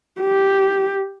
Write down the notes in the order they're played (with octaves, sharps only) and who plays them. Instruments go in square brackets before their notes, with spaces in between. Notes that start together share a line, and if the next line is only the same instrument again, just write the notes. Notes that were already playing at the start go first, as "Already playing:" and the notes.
[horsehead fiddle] G4